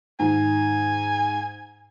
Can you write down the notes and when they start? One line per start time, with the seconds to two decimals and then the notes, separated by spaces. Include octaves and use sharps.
0.19 G#2 D#3 G#5